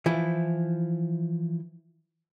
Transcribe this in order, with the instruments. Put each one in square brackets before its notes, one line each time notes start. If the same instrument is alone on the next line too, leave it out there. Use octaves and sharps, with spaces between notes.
[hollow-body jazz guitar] E3 F3 E4